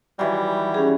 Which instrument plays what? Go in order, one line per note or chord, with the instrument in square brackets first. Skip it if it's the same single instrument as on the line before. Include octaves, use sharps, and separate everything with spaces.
[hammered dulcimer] D#3 E3 F#3 [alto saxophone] G3
[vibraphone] C#4 G4 G#4